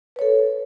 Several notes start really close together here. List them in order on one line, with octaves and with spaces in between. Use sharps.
B4 C#5 A4